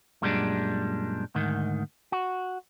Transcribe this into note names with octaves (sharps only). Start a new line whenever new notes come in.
F#2 A#2 G3 G#3 C#4 D4
D2 G#2 D#3
F#4